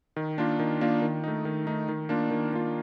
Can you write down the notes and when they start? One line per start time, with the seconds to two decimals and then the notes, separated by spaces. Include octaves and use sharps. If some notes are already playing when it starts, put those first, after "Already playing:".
0.16 D#3
0.38 A#3 D4 F4
0.59 D#3
0.81 A#3 D4 F4
1.02 D#3
1.24 A3 D#4
1.45 D#3
1.67 A3 D#4
1.89 D#3
2.09 A#3 D4 F4
2.31 D#3
2.53 A#3 D4 F4